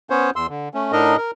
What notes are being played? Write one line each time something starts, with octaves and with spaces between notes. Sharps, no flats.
B3 C#4 C5 C#5
E2 C6 E6
D3
A3 C#4
A2 D4 D#4 A#4 D#5
A#4